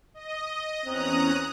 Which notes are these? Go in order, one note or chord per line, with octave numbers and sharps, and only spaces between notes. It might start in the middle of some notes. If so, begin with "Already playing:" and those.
D#5
E2 C4 C#4 A#5 D#6 F#6